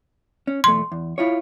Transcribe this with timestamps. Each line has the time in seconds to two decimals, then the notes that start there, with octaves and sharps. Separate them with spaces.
0.47 C#4
0.64 B1 E2 A3 C6
0.92 E2
1.18 E4 F4 C#5